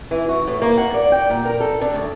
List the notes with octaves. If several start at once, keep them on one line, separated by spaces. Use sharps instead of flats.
E3
F#4
A2
A#3
F#5
D5
G5
A#2
A#4
A4
D4
D2